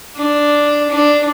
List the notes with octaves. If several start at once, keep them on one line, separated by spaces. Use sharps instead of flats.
D4
D4